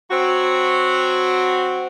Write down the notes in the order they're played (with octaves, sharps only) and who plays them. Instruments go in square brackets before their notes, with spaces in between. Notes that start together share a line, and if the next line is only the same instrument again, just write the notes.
[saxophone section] F#3 C4 F#4